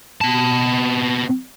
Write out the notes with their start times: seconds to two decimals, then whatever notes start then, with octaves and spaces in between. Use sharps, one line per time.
0.21 B2 A5